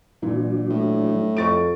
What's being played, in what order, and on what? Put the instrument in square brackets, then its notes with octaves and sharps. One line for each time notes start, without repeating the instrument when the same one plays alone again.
[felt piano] A#2 E3 [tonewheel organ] F#3 D4
[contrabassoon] A2
[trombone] F2 [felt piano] C#6 A6 D7